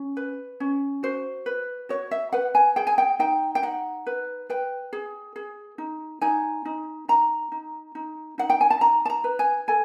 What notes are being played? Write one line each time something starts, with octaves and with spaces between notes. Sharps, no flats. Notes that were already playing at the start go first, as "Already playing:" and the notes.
Already playing: C#4
B4
C#4
F#4 C5
B4
F#4 C#5
E5
B4 F#5
G#5
G#4 G5
G#5
G5
D#4 G5
G5
D#4 F#5
B4
B4 G5
G#4
G#4
D#4
D#4 G#5
D#4
D#4 A#5
D#4
D#4
D#4 F#5
G5
G#5
A5
D#4 A#5
A5
A#5
B4
G#5
A4 G#5